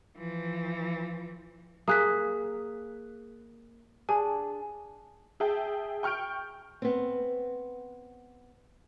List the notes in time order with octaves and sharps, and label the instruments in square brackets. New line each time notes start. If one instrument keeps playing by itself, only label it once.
[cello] E3 F3
[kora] A#3 G#4 [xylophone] D#6 F#6 B6
[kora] D4 G#4 D5 [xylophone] G#5
[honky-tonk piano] G#4 E5 G5 A5
G5 C#6 F6 G6 D7
[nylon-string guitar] B3 C4